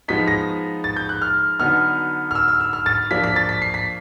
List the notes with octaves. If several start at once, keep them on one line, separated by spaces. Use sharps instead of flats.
F3 G#3 B3 D#4 B6
A#6
A6
G6
F#6
F6
D3 F#3 B3 D#4 F6
F6
E6
E6
E6
F6
A6
F3 A#3 D4 B6
B6
A6
B6
C7
B6